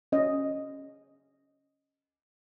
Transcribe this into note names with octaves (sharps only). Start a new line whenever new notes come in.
C#4 D#5